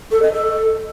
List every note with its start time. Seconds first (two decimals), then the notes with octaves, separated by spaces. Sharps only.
0.11 A4
0.22 D#5
0.33 A4